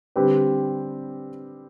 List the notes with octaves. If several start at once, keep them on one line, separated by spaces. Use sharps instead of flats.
D3 G3 C4 G4 B4